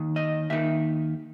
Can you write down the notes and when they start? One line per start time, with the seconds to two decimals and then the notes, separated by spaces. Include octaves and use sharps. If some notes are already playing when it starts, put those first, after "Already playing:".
Already playing: D#2 D#3
0.16 D#5
0.50 D#2 D#3 E5